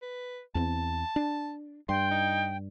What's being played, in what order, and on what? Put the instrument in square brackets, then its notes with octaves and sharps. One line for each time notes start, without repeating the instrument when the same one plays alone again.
[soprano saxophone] B4
[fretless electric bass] E2 C4 [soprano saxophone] A5
[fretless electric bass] D4
[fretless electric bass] G2 [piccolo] G5 [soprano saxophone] C6
[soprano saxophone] D#4